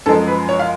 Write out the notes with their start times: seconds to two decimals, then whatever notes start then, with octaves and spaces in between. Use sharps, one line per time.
0.06 F#2 F3 G#3 A4
0.27 B4
0.49 C#5
0.59 F5